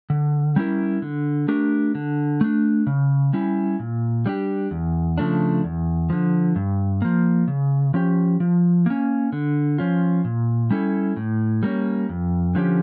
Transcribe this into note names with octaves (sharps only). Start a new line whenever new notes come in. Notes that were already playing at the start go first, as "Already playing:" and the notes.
D3
G3 C#4 E4 A#4
D3
A3 D4 G4 A#4
D3
A3 D4
C#3
G3 C#4 E4
A#2
G3 D4 G4
E2
C#3 F3 A3 D4
E2
D3 F3
G2
F3 A#3
C#3
F3 C#4 G4
F3
A#3 C#4
D3
F3 C#4 F4
A#2
G3 C#4 E4 A4
A2
G3 A#3 C#4
F2
D3 F3 C#4 G4